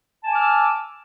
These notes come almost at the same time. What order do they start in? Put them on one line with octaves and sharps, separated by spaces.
A5 G#5 D6 F6 E6